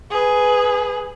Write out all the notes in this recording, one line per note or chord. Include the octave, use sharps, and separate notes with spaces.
G#4 B4